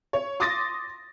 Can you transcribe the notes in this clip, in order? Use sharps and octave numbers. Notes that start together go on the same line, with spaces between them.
C#5
C6 D6 D#6 A6 A#6